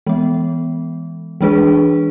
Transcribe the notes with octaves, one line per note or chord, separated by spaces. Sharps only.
E3 G#3 B3
E3 G#3 D4 G#4 B4